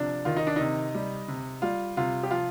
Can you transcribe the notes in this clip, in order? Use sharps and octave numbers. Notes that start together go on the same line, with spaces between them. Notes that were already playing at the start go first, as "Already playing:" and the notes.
Already playing: C3 F3 D4
D#3 F4
D#4
D4
C3 D#4
G3
C3
G3 F4
C3 F4
G4
F3 F4